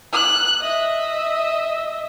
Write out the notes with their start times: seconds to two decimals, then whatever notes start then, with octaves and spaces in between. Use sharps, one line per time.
0.13 F#6
0.61 D#5 E5